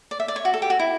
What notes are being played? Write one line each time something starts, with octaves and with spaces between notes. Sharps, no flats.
D5
E5
D5
C#5
F#4
A4
G4
F#4
E4